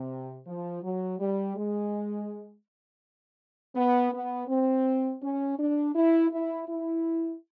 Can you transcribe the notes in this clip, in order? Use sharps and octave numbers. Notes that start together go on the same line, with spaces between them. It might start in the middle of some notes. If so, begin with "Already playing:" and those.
Already playing: C3
F3
F#3
G3
G#3
B3
B3
C4
C#4
D4
E4
E4
E4